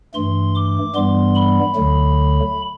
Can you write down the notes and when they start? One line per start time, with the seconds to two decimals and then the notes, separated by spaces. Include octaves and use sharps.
0.14 G2 E3 A3 C6
0.55 D6
0.95 G2 E3 G3 B3 C6
1.35 B5
1.75 D2 D3 F#3 A3